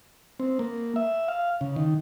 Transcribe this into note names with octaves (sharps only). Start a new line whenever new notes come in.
C4
A#3
E5
F5
C#3
D#3